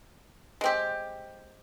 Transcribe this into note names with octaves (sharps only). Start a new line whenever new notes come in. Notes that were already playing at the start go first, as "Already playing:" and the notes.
G#3 C4 G4